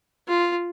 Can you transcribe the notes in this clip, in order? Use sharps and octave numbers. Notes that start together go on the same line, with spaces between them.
F4